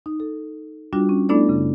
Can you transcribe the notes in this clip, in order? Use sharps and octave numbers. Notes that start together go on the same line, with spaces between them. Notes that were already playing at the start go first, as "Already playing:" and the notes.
D#4
A4
G3 D4 F4 F#4
C#4
A3 B3 D4 E4 A4 D5
F#2 C#3